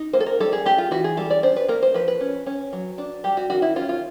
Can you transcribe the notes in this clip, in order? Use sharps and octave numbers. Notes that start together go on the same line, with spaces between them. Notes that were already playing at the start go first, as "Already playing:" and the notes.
Already playing: D#4
A#3 C5
A4
A#4
G3 A4
G#4
A3 G4
F4
E3 F#4
G#4
G3 A4
D5
D4 C5
B4
A#3 A#4
C5
F3 B4
B4
C#4
C#4
F#3
D4
G3 G4
F#4
D#3 F#4
E4
C#4 F4
F4